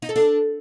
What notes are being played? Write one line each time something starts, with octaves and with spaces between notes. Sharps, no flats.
D#4
A4
D4